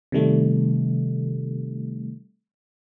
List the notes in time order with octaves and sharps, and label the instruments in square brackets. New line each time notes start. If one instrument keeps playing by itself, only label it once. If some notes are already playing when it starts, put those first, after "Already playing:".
[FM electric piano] C3 D#3 G3 A3